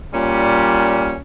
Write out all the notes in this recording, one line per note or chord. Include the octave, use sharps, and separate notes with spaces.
A#2 G3 C#4